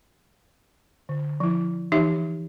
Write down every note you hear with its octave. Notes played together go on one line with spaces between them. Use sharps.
D3
F3 E4
E3 D#4 G4 E5